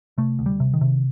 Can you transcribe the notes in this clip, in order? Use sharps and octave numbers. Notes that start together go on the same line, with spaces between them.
C3 A3
D2
G3
C3
D#3
C3